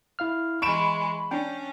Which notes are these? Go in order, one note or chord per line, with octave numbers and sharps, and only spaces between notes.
E4 F5 F6
E3 G#3 B5 C#6 D7 E7
C#4 D4 G5